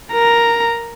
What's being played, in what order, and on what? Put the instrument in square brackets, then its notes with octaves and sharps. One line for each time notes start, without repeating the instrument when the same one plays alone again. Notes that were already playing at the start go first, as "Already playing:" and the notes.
[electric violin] A#4 A#5